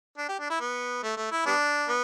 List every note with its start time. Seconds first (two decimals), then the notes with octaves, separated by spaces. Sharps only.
0.18 D4
0.29 G4
0.40 D4
0.50 E4
0.60 B3
1.03 A3
1.17 A3
1.32 E4
1.46 G3 B3 D4
1.89 B3